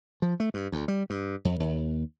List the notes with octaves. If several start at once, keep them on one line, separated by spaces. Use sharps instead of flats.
F3
A3
G2
D2
G3
G2
F2
D#2